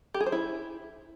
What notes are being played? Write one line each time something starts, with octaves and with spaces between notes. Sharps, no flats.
G4
G#4
C5
E4